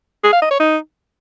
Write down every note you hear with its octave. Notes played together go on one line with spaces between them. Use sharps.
G#4
F5
D#5
C#5
D#4